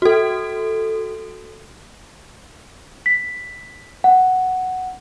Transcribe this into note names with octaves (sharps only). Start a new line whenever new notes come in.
F#4 A4
B6
F#5